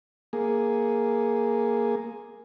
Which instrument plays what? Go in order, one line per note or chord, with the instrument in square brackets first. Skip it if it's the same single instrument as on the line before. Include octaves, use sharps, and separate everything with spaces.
[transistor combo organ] A#3 G#4